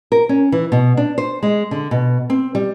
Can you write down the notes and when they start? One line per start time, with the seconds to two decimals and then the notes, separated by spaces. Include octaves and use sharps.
0.12 A#4
0.29 C#4
0.52 E3
0.72 B2
0.97 D4
1.18 C5
1.43 G#3
1.71 D3
1.91 B2
2.30 C4
2.55 G3